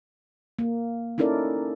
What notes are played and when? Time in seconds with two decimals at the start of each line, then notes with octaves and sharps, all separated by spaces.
0.59 A#3
1.18 C#4 D#4 E4 A4 A#4 D5